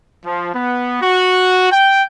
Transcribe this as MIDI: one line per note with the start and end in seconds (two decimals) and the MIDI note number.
0.25 0.49 53
0.54 0.98 59
1.01 1.70 66
1.71 2.03 79